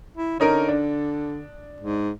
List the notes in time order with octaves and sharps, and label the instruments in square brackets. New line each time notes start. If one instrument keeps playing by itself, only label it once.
[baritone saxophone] E4
[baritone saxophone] D3 [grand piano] C#4 D#4 A#4
[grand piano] D4
[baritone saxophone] G#2